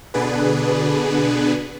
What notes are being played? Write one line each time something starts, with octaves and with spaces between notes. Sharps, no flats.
B2 D3 B3 D4 G#4 B4